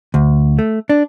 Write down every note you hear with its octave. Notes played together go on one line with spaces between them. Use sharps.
D2
A3
D4